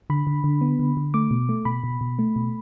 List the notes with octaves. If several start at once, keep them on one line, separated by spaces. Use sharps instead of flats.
D3 B5
D3
D3
B3
D3
D3
A3 D6
B2
A3
B2 B5
B2
B2
A3
B2